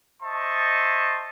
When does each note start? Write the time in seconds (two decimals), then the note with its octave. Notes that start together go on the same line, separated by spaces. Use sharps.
0.23 C5 D#5 E5 A5 C#6